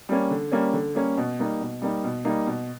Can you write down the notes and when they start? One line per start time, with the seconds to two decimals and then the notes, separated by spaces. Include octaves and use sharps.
0.09 G3 A#3 C#4
0.31 D3
0.52 G3 A#3 C#4
0.73 D3
0.95 G3 A#3 C#4
1.17 B2
1.39 G3 A#3 D#4
1.61 B2
1.82 G3 A#3 D#4
2.04 B2
2.25 G3 A#3 D#4
2.47 B2